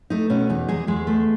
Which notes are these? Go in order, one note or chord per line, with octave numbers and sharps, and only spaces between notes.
A3 D#4
B2 C#4
E2 D#4
E2 G#3 G#4
E2 G#3 G#4
A3